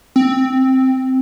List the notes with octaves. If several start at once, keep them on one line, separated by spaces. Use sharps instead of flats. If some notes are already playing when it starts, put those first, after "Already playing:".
C4